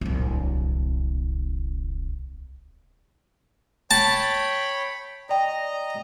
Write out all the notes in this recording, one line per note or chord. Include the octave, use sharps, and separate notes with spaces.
D1 C2
C#5 G5 A5 B5
D5 D#5 G5 A#5